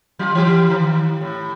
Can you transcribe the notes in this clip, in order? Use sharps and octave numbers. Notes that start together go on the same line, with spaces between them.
F#3 F4
E3 G4
D#3
A2